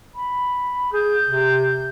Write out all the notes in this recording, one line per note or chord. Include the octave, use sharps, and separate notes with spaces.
B5
G#4 G6
C3